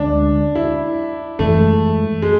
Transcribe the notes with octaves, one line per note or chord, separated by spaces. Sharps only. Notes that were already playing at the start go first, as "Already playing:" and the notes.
Already playing: D2 D3 G#3 C#4 D4
E4
F#2 E3 G#3 A3
G#3